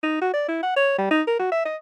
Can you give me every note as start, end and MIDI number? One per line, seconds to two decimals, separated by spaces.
0.03 0.18 63
0.21 0.30 66
0.33 0.44 74
0.48 0.58 64
0.63 0.75 78
0.76 0.95 73
0.98 1.11 55
1.11 1.22 63
1.27 1.35 70
1.39 1.49 66
1.52 1.64 76
1.65 1.77 75